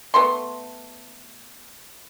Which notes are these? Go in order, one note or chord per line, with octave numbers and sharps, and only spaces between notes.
A3 B3 C6